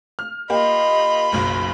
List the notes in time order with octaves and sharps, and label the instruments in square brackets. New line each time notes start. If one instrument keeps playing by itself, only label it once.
[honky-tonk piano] F6
[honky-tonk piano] A#3 G4 [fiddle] F4 B5 [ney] D#5
[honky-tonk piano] F#1 B1